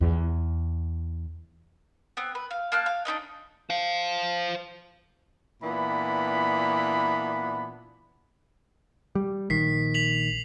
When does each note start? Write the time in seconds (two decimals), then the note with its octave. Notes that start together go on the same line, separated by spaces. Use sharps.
0.01 E2
2.17 B3 C4
2.35 B4
2.51 F5
2.72 A#3 A5 F6 F#6
2.86 F5
3.05 D4 D#4 B4 D#5
3.70 C5 F5
5.62 A#2 E3 B3 D4 B5
9.15 G3
9.50 A#1 D#3 B6 C7
9.94 B6 F7 F#7